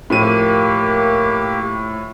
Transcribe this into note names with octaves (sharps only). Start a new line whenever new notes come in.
A2 F3 A#3 G4 D#7